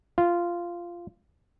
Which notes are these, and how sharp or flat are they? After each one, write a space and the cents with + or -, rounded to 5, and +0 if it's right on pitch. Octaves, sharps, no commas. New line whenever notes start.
F4 -10